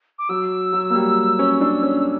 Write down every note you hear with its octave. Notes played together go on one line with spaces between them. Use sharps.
D6
F#3 E6
F#3
A#3
G3
C#4
D4
C#4
E6